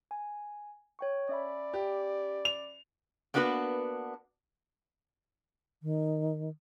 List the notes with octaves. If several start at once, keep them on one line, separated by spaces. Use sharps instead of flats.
G#5
C#5 G5 C#6
C#4 D5 E5 B5
G4
F7
A#3 B3 D4 F#4 G#4 B4
D#3